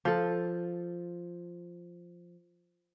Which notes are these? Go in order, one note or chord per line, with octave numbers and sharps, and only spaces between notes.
F3 A4